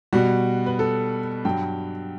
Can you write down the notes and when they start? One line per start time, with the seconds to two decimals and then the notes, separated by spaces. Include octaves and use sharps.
0.13 B2 G3 F#4
0.66 B4
0.79 A4
1.45 G2 F#3 G5